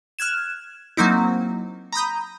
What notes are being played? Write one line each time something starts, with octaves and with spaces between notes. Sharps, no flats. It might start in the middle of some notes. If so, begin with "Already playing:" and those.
F6 F#6 G#6 E7
F#3 A#3 C4 D#4 E4
A#5 B5 D#6 G6